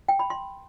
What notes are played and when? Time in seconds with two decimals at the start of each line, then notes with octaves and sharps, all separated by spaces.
0.08 G5
0.19 B5
0.30 C6